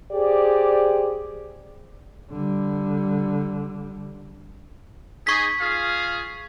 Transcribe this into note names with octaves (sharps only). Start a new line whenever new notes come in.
G4 G#4 C5 D5
D3 G3
D#4 G#4 C#6 B6
F4 G#4 F5